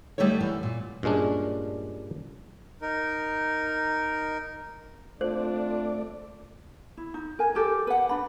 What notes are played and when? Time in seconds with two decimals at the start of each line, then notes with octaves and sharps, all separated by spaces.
0.18 D3 G3 A3 D#4 A4 C#5
0.40 F#2 E3
0.63 A#2
1.03 G2 A#2 G#3 C#4 D4
2.82 D#4 A#4
5.21 A3 C4 D4 F4 C5 D5
6.97 E4
7.14 D#4
7.39 A#4 G#5
7.55 G4 A4 A#4
7.87 B4 F#5
8.09 D4 B5